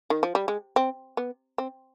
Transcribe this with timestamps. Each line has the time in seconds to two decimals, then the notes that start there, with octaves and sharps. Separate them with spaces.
0.10 D#3
0.23 F3
0.35 G3
0.48 G#3
0.76 C4
1.17 B3
1.58 C4